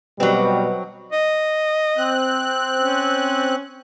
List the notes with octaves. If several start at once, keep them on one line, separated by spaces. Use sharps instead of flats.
B2 F#3 G3 C4 B4 D#5 F#5
D#5
C4 F#6
C#4